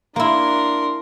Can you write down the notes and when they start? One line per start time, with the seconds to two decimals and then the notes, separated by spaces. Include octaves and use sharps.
0.16 A#3 D4 E4 A#4 C6